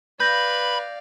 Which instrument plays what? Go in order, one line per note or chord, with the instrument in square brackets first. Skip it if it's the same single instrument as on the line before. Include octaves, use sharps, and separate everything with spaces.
[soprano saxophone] B4 [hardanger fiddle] D5 F5 [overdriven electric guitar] B5 [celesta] G6 A#6